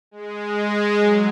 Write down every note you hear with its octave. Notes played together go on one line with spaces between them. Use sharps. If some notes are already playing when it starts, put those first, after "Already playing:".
G#3
F#3